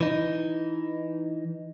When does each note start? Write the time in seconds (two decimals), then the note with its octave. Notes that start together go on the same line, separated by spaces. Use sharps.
0.01 E3 D#4